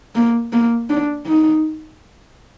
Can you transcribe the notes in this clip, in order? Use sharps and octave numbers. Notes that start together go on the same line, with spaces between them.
A#3
A#3
D4
D#4